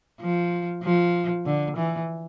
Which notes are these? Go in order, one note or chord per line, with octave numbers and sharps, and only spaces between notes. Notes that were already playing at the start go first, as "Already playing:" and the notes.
F3
F3
D3
E3